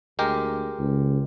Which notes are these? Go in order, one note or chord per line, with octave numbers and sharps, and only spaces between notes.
D2 G#3 G4 A#4
C#2